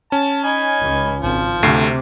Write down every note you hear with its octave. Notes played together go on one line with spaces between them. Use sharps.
C#4 A5
D#4 G#5 B5
C#2
G#1 F3
D2 C3 A3 C7